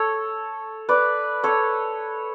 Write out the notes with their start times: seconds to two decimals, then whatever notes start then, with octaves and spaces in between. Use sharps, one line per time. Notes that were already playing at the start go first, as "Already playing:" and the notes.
Already playing: A4 C#5
0.89 B4 D5
1.44 A4 C#5